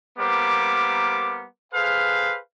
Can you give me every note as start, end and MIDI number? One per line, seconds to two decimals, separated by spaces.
0.19 1.46 55
0.19 1.46 58
0.19 1.46 59
0.19 1.46 70
0.19 1.46 72
0.19 1.46 86
1.74 2.38 68
1.74 2.38 69
1.74 2.38 71
1.74 2.38 72
1.74 2.38 77